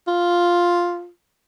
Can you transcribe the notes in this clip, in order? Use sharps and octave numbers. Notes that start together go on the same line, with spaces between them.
F4